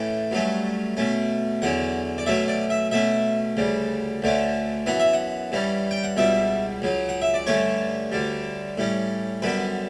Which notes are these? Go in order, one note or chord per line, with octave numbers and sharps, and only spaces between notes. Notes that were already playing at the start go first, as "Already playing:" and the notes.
Already playing: A2 E3 A3 C#4 G5
G2 F#3 A3 C#4
B2 A3 C#4
E2 D3 F#3 C#4 F#5
D5
B2 F#3 A3 C#4 E5
D5
E5
B2 A3 C#4 E5
D2 C#3 G3
D2 D3 A3 C#4
F#2 E3 B3 F#5
E5
F#5
G2 E3 G3 C#4
G5
F#5
C#2 B2 G3 B3 E5
C#2 C#3 F#3
F#5
E5
D5
G2 D3 A3 C#4 C#5
D2 D3 G3
A2 G3 C#4
F#2 D3 G3 B3 B4